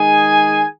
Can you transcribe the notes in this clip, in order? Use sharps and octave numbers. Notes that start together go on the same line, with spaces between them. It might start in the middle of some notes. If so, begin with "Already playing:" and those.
Already playing: D#3 G#3 D#4 G#4 G#5